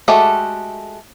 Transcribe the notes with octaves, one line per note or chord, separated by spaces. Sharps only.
G#3 A3 F#4 G4 A4